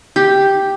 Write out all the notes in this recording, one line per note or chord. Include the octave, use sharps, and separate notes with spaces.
G4